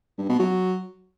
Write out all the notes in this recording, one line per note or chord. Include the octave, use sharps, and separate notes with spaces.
G2
B2
F#3